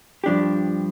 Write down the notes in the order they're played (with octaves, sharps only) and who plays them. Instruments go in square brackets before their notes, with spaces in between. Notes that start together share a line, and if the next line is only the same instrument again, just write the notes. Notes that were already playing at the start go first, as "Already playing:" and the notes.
[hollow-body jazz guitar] G2 F3 D4 G4